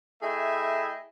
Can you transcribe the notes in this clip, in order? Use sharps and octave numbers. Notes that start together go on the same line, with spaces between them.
A3 E4 G#4 D#5 E5 G5